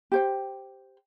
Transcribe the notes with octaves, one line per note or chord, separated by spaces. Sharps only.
G4 C5 G5